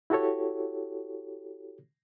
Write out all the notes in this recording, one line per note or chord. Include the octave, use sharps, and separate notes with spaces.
E4 F#4 G4 A4 C#5